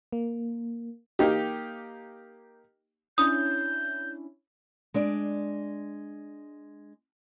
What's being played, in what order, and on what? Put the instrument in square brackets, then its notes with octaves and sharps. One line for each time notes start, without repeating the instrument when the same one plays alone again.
[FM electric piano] A#3
[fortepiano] A#3 D#4 G4
[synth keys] C#4 D4 E4 [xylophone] D#6 [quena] G6
[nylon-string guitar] G#3 D4 D5